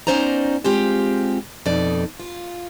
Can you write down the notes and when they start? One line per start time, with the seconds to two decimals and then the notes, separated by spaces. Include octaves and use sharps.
0.07 B3 C#4 D#4 C5 D5 A#5
0.64 G#3 C4 F4 G4
1.66 F2 B2 D#4 D5
2.20 F4